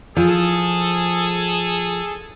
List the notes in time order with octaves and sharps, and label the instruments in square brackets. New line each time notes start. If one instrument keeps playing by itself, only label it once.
[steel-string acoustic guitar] F3 [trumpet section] G#4 A4